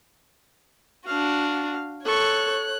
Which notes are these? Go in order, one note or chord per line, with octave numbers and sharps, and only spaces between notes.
D4 F#4 F5
A4 C#5 C#6 F#6